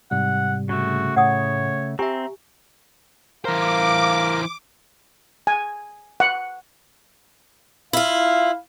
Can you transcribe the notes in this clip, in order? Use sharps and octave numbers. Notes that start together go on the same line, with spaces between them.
G#2 C3 G3 F#5
C#3 A3 F#4
A2 C#5 F#5 D#6
C4 G4 E5 G#5 A#5
E3 A#4 C5 F5 D6
G#5
F#5
E4 F4 F5